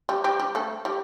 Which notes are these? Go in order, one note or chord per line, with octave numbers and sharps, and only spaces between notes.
G3 G4
G3 G4
G3 G4
A3 A4
G3 G4